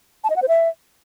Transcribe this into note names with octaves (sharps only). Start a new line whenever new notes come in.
A5
D#5
F#5
C5
E5